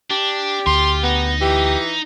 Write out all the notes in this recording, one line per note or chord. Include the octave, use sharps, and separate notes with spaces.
D4 G4
D2 F4 C6
B3 D#4
E3 G4